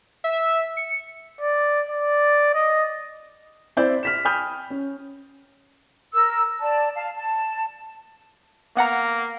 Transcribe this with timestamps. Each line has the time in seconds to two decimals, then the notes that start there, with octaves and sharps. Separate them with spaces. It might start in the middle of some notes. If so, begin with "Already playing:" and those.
0.24 E5
0.77 C#7
1.41 D5
1.89 D5
2.55 D#5
3.77 C4 E4 C5 D5 G6
4.03 F6 B6 E7
4.25 G5 G#5 B5 D#6 F6 G6
4.70 C#4
6.14 A#4 E6
6.59 D5 A5
6.95 F5 A5
7.16 A5
8.77 A#3 B3 F#5 A#5